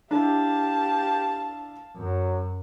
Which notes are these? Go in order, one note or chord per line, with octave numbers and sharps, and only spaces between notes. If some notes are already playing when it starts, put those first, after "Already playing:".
D4 E4 G4 F5 A5
F#2 F#3